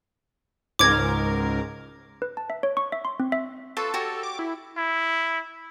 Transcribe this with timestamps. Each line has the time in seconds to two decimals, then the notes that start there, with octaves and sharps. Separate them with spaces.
0.79 C#2 G#2 A#4 D6 G#6
2.22 B4
2.37 A5
2.50 E5
2.63 C#5
2.77 C#6
2.92 E5
3.05 C6
3.20 C4
3.32 E5
3.77 F4 A4 B4 C#5
3.94 F#4 G4 C#5
4.23 D6
4.39 E4
4.77 E4